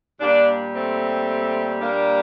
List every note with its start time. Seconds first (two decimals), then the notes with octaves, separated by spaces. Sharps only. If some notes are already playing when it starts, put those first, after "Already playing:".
0.21 A#2 G3 A#3 D4
0.74 A3 C4
1.82 A#3 D4